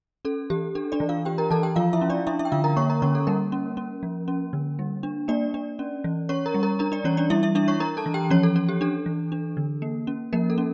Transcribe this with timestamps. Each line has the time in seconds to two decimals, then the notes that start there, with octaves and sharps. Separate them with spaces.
0.25 C#4 A4
0.50 E3 G4
0.75 D4 A4
0.92 D4 D5
1.00 E3
1.09 F4 F5
1.25 D4 G4 G5
1.38 A#4 A#5
1.50 E3 A4 A5
1.63 G4 G5
1.76 F3 F4 F5
1.93 E4 E5
2.01 C#4
2.10 D4 D5
2.26 D4 E4 E5
2.39 E4 E5
2.45 G5
2.52 D3 F4 F5
2.64 A#4 A#5
2.76 A#3 C#5 C#6
2.90 A#4 A#5
3.02 D3 C#4 C#5
3.15 A4
3.27 G3 A#3 A#4
3.52 C#4
3.77 C#4
4.03 F3
4.28 C#4
4.53 D3
4.79 G3
5.03 D4
5.28 A#3 D4 D5
5.54 D4
5.79 C#4
6.04 E3
6.29 C#4 C#5 C#6
6.46 A#4 A#5
6.54 G3
6.63 A#4 A#5
6.79 D4 A#4 A#5
6.92 D4 D5
7.04 E3 C#4 C#5
7.17 D4 D5
7.30 G3 E4 E5
7.43 E4 E5
7.55 D4 E4 E5
7.68 C#5 C#6
7.80 D4 A#4 A#5
7.97 A4 A5
8.06 E3
8.14 G4 G5
8.30 F3 C#4 C#5
8.43 A4
8.56 C#4 A4
8.69 G4
8.81 D4 A4
9.06 E3
9.32 D4
9.57 D3
9.82 A#3
10.07 C#4
10.33 F3 A#3 A#4
10.50 A4
10.58 C#4